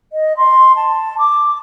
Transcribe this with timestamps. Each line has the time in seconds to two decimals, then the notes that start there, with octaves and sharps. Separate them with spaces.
0.13 D#5
0.37 C6
0.76 A5
1.19 D6